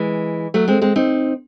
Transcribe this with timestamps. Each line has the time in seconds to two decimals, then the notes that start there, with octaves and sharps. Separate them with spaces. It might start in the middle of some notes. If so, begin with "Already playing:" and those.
Already playing: E3 G#3
0.54 F#3 A3
0.68 G#3 C4
0.82 G#3 C4
0.96 C4 D#4